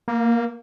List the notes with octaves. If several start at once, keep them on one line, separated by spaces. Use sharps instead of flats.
A#3